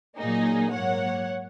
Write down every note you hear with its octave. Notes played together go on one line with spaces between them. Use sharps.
A#2 F#3 A#3 D#4 G#4
G#2 F#3 A#3 C#5 F#5